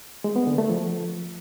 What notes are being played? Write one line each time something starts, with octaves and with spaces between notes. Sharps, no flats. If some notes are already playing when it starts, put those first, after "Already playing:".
G#3
B3
D3
A3
F3